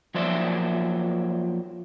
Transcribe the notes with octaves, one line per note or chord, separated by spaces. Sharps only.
F3 F#3 A#3 C5 D5 E5